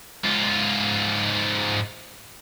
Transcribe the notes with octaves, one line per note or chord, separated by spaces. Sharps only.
G#2 F4